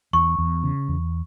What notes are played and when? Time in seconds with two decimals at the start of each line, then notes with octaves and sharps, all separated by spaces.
0.13 E2 C#6
0.38 E2
0.64 C#3
0.89 E2